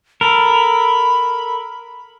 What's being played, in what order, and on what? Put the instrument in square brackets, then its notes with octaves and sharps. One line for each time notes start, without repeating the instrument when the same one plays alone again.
[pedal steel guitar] A4 A#4 [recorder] B5